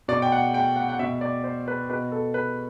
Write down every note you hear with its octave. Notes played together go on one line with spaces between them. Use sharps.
B2 D5
G5
F#5
G5
F#5
F#5
B2 E5
D5
C5
B4
B2 B4
A4
B4